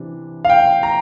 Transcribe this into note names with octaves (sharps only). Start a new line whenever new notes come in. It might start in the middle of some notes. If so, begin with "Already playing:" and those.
Already playing: C3 E3 D4
F5
G5
A#5